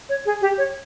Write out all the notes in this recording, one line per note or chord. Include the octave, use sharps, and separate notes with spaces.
C#5
G#4
G4
C#5